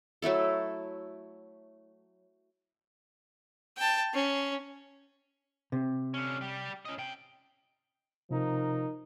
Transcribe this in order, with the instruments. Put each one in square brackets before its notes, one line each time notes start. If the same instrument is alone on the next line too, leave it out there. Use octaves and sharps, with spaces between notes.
[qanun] F#3 A3 E4 A4
[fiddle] G5 A5
C#4
[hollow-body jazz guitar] C3
[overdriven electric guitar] D3 C#4
G3 G4
C#4 D#5
C3 G5
[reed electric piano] C3 [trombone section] F3 D#4 A#4